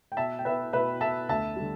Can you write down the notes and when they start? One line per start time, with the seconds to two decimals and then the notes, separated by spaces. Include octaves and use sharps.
0.12 G5
0.17 B2 E5 A5
0.39 G5
0.45 B3 B4 E5
0.73 B2 B4 E5
1.01 B3 E5 A5
1.29 D2 E5 A5
1.56 D3 G3